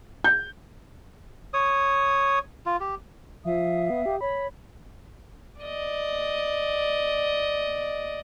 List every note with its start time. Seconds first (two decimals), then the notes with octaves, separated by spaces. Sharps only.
0.24 G6
1.54 C#5 D#6
2.66 F4
2.80 G4
3.45 F3 E5 F5 D#6
3.90 B3
4.06 G4
4.21 C#5 B5
5.61 D5 D#5